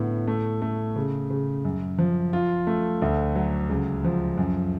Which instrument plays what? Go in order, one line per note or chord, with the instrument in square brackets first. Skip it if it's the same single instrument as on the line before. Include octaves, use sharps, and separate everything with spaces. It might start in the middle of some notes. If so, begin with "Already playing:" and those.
Already playing: [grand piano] A2 D3 B3
A3
A3
C#3
C#3
F#2
F3
F4
A3
D2
F#3
C#2
F3
F#2